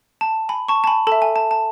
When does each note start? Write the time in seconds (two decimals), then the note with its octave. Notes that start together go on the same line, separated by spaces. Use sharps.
0.21 A5
0.49 G#5 B5
0.68 A5 C#6
0.84 A5
0.87 G#5 B5
1.07 A4 A5
1.12 E5
1.22 G#5
1.36 A5
1.51 A5